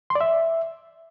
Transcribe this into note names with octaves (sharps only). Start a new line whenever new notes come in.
C6
D5
E5